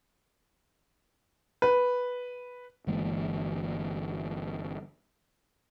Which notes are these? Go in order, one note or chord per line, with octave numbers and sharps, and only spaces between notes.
B4
G1 E3 G#3 A#3